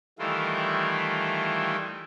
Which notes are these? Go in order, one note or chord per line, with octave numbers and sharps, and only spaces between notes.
D#3 E3 G3 A3 E4 F4